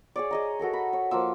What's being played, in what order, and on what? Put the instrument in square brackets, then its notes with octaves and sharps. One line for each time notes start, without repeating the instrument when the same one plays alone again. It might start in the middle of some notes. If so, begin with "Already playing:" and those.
[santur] G#4 C#5 D5
G#4 D#5 A#5
F#4 A4 A#4 A#5
B5
C#5
F3 A#3 F4 E6